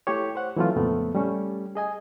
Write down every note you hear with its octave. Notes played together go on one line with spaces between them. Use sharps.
A3 E4 G4 C#5
C5 C#5 F#5
E3 F#3 A3 C4 F4
F2 A#2 C#3 A3 B3 C4
G3 A3 C#4
G#4 D#5 G#5